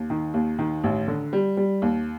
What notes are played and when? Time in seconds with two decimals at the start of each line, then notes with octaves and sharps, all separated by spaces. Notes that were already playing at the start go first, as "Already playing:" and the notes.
Already playing: D#2
0.10 D#3
0.34 D#2
0.59 D#3
0.84 A1
1.08 D3
1.33 G3
1.57 G3
1.82 D#2